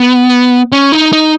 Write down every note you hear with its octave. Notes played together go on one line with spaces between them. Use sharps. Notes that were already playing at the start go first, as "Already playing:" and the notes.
Already playing: B3
C#4
D#4
D#4